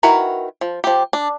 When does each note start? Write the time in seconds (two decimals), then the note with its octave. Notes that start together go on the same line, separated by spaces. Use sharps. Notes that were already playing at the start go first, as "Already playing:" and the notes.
0.03 D#3 E4 F#4 A#4 B4
0.61 F3
0.84 F3 G4
1.13 D4